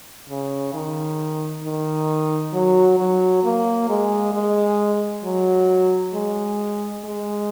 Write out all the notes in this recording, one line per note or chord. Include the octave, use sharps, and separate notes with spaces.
C#3
D#3
D#3
F#3
F#3
A#3
G#3
G#3
F#3
G#3
G#3